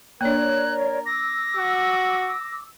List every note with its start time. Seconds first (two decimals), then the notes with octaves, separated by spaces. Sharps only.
0.21 A#3 D4 A#4 C#5 D5 F#6
1.06 D6 E6 A#6
1.57 F#4